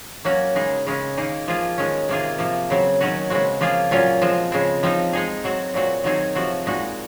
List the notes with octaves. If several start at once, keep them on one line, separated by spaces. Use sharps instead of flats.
F#3 A#3 C#4 F#4
C#3 G#3 D#4 G#4
C#3 G#3 C#4
D#3 A#3 D#4 G#4
F3 A#3 F4 G#4
D#3 G#3 C#4
C3 D#3 A#3 F4 G#4
C3 F3 A#3
C#3 F#3 C4
D#3 F#3 C#4 F#4
C#3 G#3 C4 F#4
F3 A#3 F4 G#4
A#2 F#3 C#4 F4
F3 G#3 C4
C#3 G#3 C4
F3 C4 D#4
G#3 D#4 G#4
F#3 C4 F#4
A#2 F#3 C4 F#4
D#3 F#3 C4 D#4 G#4
C3 F3 C4 F#4
A#2 G#3 D#4 F#4